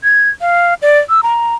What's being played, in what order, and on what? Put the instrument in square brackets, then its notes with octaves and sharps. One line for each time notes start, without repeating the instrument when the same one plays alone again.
[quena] G#6
F5
D5
E6
A#5